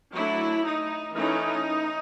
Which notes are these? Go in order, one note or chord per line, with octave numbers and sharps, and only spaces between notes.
F#3 A3 D4 E4
D#4
E3 A3 C#4 D#4